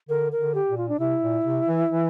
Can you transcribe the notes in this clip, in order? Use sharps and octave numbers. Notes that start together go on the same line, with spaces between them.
D3 A#4
A#4
D3
G4
A#2
F4
D4
C3 E4
A#2
C3
E3
E3